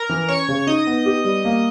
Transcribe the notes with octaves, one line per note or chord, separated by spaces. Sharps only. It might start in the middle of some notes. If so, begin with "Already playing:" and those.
Already playing: A#4 A#5
E3
C#4 C#5 C#6
C#3
D#4 D#5 D#6
B3
G4
G3
A#3